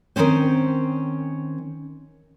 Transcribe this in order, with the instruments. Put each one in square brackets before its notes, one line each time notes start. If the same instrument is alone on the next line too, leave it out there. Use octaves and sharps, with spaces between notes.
[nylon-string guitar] D#3 G#3 C4 C#4 C5